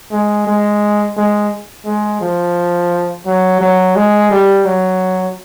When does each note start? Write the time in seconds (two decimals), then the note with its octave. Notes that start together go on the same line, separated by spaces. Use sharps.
0.12 G#3
0.47 G#3
1.17 G#3
1.86 G#3
2.21 F3
3.26 F#3
3.61 F#3
3.96 G#3
4.31 G3
4.66 F#3